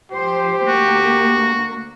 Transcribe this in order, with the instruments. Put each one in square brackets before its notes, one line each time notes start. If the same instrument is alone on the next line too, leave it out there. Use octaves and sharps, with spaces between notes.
[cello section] F3 C5 [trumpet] G4
[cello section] D2 A#3 [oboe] F#4